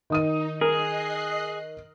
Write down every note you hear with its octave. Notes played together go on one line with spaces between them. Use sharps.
D#3 D#4 D#6 D#7
G#4 A#4 D#5 F#6 C7